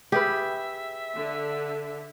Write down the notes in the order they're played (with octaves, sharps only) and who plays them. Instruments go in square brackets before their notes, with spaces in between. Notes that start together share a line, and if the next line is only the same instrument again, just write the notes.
[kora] G4 [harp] G#4 B4 [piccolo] E5
[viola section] D3